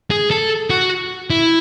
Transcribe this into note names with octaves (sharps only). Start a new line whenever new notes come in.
G#4
A4
F#4
E4